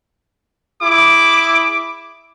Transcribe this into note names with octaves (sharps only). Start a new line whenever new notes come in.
E4 G#4 D6